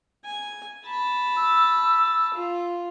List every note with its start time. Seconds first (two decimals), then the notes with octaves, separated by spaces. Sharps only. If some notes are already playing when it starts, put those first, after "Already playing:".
0.25 G#5
0.85 A5 B5
1.37 E6
2.34 F4